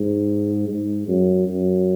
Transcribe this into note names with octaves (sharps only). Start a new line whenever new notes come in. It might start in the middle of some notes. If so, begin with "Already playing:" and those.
Already playing: G#2
G#2
F#2
F#2